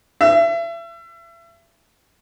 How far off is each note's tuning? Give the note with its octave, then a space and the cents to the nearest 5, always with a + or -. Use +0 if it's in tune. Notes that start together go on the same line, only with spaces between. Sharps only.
E5 +35